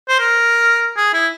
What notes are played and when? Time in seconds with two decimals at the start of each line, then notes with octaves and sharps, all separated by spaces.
0.09 C5
0.20 A#4
0.97 G#4
1.14 E4